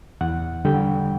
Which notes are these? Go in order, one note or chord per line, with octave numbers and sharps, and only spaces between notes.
E2 F#5
D3 G3 G5